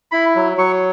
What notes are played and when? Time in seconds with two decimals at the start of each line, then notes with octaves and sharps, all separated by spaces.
0.12 E4 B5
0.36 F#3
0.58 F#3 C#6